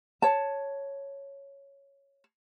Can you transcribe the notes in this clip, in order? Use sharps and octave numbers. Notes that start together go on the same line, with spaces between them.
C#5 A5